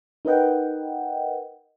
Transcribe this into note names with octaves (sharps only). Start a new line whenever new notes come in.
D#4 A#4 B4 D#5 F#5 G5